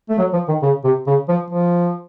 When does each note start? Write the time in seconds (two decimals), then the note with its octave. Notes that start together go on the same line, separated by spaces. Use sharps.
0.09 A3
0.18 F#3
0.33 F3
0.48 D#3
0.63 C#3
0.84 C3
1.07 C#3
1.28 F3
1.50 F3